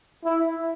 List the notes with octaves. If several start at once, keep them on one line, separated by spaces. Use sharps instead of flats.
E4